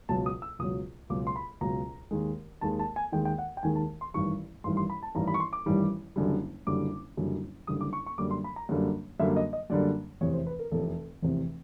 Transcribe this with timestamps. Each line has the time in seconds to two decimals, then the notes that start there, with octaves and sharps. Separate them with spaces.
0.09 C#2 B2 F#3 A5
0.26 D#6
0.42 E6
0.59 C#2 B2 F#3 D#6
1.10 C#2 B2 F#3 D6
1.27 C6
1.36 B5
1.61 C#2 B2 F#3 A#5
2.11 D#2 D#3 G#3
2.61 D#2 D#3 G#3 A5
2.79 A5
2.96 G#5
3.12 D#2 D#3 G#3 G5
3.25 G5
3.38 F#5
3.57 G5
3.63 D#2 D#3 G#3 G#5
3.75 A5
4.01 C6
4.14 A1 G2 D#3 G3 C#6
4.64 A1 G2 D#3 G3 C6
4.77 C6
4.90 B5
5.03 A5
5.15 A1 G2 D#3 G3 A#5
5.28 B5
5.34 C#6
5.40 C6
5.53 D6
5.66 A1 G2 D#3 G3
6.16 F#1 F#2 D3 G3
6.67 F#1 F#2 D3 G3 D6
7.17 F#1 F#2 D3 G3
7.67 F#1 F#2 D3 G3 D#6
7.81 D6
7.93 C#6
8.06 C#6
8.18 F#2 D3 G3 A#3 D6
8.31 C6
8.44 B5
8.56 A#5
8.69 F#2 D3 G3 A#3
9.20 F#2 D3 G3 A#3 E5
9.36 D#5
9.53 D#5
9.70 F#2 D3 G3 A#3 D5
10.21 F1 E2 C3 C#5
10.34 C5
10.47 B4
10.59 A#4
10.71 F1 E2 C3 A4
11.22 F1 E2 C3